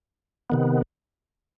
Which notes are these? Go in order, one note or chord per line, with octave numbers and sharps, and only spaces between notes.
C3 D#3 B3